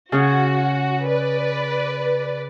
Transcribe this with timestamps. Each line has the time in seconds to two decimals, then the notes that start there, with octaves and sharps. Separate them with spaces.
0.12 C#3 C#4 F#4 G#4
1.07 B4 D5